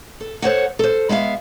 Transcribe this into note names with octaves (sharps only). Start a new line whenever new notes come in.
A4
A4 C5 C#5 F#5
A4 C5
G#3 B3 E5 F5